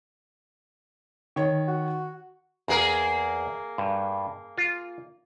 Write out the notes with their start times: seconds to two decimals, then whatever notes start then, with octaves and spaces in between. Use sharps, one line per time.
1.36 D#3 C#5
1.68 F#4
2.68 E2 A#3 G#4 A#4
3.78 G2
4.58 F4